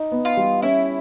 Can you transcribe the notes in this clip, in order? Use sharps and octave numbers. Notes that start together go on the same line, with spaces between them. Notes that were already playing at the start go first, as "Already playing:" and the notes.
Already playing: D#4
B3
F4
G3
C#4 E4